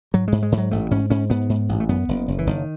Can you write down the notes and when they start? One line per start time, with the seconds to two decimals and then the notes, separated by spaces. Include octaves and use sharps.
0.14 G#2 F#3
0.28 G#2 G#3
0.43 G#3
0.52 G#2 E3
0.58 F#3
0.71 A1 A3
0.91 G#2 C#4
1.10 G#2 C#4
1.30 G#2 B3
1.49 G#2
1.69 A1
1.80 A3
1.89 F#2 B3
2.08 F#1
2.28 F#1
2.39 E3
2.47 F#1 D#3